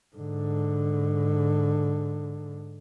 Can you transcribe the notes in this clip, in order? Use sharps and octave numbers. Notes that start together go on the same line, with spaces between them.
G#2 D3